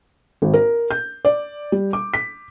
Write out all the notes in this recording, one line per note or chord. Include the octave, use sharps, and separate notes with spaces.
G#1
A#4
G6
D5
G3
D6
B6